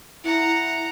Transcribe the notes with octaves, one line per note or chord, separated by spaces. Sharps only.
E4 F#5 A#5